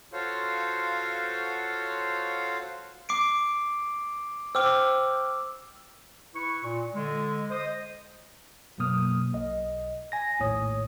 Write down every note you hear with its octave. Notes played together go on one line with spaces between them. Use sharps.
F4 F#4 A4 C5 C#5 F5
D6 C7 D7
C5 G5 D6 E6 F6
E4 B4 C#6
A#2
D3 G#3
C5 D#5 D#6
F#2 B2 F#3 A#3 D#6 F6
B1 D#5
G#5 A#6
A#1 D#2 A2 C#5 D#6